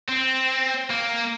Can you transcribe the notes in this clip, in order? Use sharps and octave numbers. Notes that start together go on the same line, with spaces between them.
C4
A#3